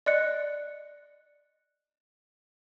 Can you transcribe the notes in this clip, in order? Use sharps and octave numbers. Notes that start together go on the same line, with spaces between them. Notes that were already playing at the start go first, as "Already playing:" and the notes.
D5 D#5 F#6 C#7